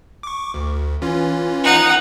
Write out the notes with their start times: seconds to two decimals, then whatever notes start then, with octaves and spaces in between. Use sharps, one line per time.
0.23 C#6 D6
0.54 D2
1.02 E3 C#4 F4
1.63 D#4 F#5